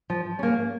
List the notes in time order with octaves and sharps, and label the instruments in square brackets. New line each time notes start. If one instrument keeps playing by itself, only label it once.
[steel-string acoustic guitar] F3
A#3 C#4